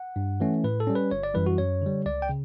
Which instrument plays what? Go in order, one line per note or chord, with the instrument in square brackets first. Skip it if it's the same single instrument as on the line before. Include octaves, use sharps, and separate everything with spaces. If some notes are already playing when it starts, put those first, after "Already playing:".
Already playing: [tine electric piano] F#5
G2
E3 A3 C#4
A2 B4
A4
G3 C#4
B4
G1 C#5
D5
F#2 E3 G3 B4
F#4
F#2 C#5
D3 G3
C#2 D5
G5
C#3